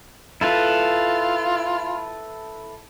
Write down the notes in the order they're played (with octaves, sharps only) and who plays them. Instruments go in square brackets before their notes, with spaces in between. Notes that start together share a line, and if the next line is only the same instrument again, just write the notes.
[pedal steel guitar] E4 A4 B4 [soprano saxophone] F4